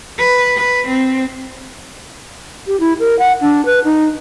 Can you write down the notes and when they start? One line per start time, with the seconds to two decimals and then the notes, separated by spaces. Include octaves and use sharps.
0.18 B4
0.56 B4
0.87 C4
2.67 G4
2.80 E4
3.00 A#4
3.19 F#5
3.42 D4
3.65 B4
3.84 D#4